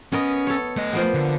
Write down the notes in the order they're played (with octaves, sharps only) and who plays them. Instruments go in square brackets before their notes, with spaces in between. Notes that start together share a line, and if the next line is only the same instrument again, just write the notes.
[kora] B3 A#4 D#5 [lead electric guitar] C#4
[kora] A4 C#5
[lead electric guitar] A3 D#5
[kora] F3 A#3 B3
[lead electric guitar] D3